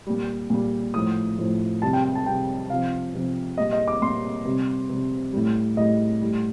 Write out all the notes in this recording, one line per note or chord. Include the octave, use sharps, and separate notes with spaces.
A#2 G3
A#2 G3
A2 F3 D#6
A2 F3
C3 G3 A5
G5
G5
A5
C3 G3 G5
C3 F3 F5
C3 F3
A#2 G3 D#5
D#5
D6
A#2 G3 C6
C3 G3
C3 G3
A2 G3
A2 G3 D#5
A2 G3